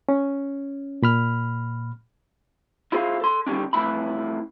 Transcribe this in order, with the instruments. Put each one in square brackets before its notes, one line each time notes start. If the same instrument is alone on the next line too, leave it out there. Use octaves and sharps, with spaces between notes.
[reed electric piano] C#4
A#2 B5 F6
[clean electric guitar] E4 F4 G#4 C5 E5 F5
A4 C6
D3 D#3 G3 C#4 D4
F2 A2 C3 E3 E4 B5